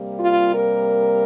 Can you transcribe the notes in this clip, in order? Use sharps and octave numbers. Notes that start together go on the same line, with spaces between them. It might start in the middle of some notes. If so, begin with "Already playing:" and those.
Already playing: C3 G3 A#3
F4
A#4